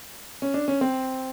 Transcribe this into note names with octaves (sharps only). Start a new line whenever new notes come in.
C#4
D4
C#4
C4